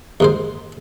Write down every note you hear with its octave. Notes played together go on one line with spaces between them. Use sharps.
D#2 G#2 C5